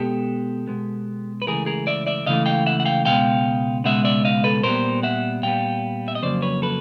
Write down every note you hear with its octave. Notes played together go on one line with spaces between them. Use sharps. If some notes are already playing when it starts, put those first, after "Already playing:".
Already playing: B2 G#3 B3 G4 A4
B2 G#3 B3
B4
C#2 C#3 E3 A3 G#4 A#4
G#4 A#4
D5 E5
D5 E5
C#2 C#3 E3 A3 D#5 F5
F5 G5
E5 F#5
F#5
F5 G5
C#2 B2 G#3 B3 F5 G5
C#2 B2 G#3 B3 E5 F#5
D5 E5
D#5 F5
A4 B4
A#2 G3 B3 A#4 C5
E5 F#5
A#2 G3 B3 F5 G5
E5
D#5
F2 C#3 F#3 A#3 C5 D5
B4 C#5
A4 B4